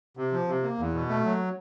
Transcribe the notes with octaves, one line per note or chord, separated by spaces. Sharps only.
C3
F3
C3
A#3
E2
B2
A3
F#3